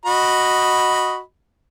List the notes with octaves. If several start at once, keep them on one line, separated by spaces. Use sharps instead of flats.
F#4 D#5 B5